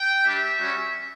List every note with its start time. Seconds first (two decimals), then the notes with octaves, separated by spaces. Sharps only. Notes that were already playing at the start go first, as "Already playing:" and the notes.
Already playing: G5
0.25 G3 D4 G4 E5
0.59 G3 C#4 F#4